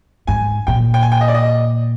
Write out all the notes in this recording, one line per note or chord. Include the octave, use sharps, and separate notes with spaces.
G#2 G#5
A#2 G5
G5
G#5
G5
D#5
D5
D#5